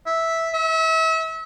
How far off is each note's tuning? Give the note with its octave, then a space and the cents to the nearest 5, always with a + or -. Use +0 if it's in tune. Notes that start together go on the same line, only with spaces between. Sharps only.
E5 -5
E5 -35